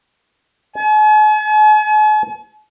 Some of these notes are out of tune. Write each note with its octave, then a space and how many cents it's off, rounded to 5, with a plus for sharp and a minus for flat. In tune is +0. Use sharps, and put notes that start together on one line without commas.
G#5 +45